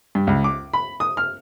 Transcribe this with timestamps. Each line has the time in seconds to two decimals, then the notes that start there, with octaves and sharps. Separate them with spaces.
0.15 G2
0.27 C#2
0.44 D6
0.74 B5
1.00 D#6
1.17 F6